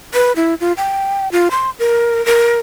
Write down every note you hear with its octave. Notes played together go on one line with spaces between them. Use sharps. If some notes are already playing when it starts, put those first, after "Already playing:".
B4
E4
F4
G5
F4
C6
A#4
A#4